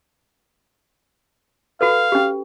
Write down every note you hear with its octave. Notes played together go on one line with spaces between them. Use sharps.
F#4 A4 B4 F5
C#4 G4